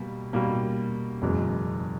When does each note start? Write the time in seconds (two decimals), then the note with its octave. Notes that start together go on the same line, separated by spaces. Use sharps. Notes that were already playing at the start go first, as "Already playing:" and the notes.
Already playing: B2 G3 A#3
0.33 B2 G3 A#3
1.22 F#1 E2 B2 G#3